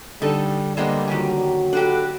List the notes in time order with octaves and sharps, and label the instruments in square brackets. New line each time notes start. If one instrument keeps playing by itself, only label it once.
[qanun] D3 [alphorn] G3 [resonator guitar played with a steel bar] D#4 A4
[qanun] D3 A#3 C5 [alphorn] G3 [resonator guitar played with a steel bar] G#3 B3 D#5
[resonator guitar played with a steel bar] D#3 G4 G#5 [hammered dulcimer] F#3 A#5
[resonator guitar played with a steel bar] D4 F#4 G4 [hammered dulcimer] E4 B5 [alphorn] A4 [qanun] F#5